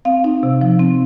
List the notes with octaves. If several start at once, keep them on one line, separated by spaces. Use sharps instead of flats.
C4 F5
D#4
C3
F3
C4